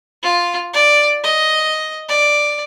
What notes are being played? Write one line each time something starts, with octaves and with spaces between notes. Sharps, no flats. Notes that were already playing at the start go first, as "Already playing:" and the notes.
F4
D5
D#5
D5